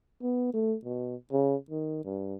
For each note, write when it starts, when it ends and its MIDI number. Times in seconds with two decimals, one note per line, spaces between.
0.22 0.52 59
0.54 0.75 57
0.85 1.15 47
1.32 1.56 49
1.70 2.04 51
2.05 2.35 43